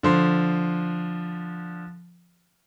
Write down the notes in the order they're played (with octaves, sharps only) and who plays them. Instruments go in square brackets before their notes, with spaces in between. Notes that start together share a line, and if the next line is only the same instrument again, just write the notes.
[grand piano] D3 F3 C6